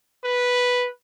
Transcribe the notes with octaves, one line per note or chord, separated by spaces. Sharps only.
B4